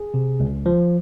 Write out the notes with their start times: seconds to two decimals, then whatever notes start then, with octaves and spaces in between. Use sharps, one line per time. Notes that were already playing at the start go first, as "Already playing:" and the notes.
Already playing: G#4
0.14 C3
0.40 C#2
0.66 F3